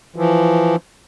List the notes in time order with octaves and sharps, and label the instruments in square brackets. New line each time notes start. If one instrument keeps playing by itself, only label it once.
[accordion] E3 F3